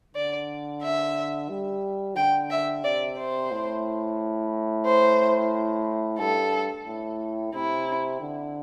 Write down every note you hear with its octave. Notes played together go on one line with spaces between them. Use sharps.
D3 D5
E5
G3
D3 G5
E5
C3 D5
C5
A2
C5
G2 A4
A2
C3 E4
D3